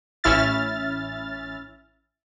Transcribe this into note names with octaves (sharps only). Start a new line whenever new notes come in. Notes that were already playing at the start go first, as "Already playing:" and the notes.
A1 C#4 E4 E5 F6 A6